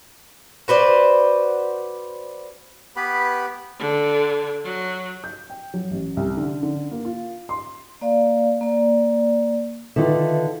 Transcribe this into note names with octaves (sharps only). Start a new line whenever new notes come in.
F#4 B4 C5 D5
B3 G4 B4 B5
D3
F#3
G6
G5
F#3
A1
C2
D3
D3
A#3
F4
C6
A#3 D5 F5
A#3 D5
D3 D#3 F4 A4 B4 E5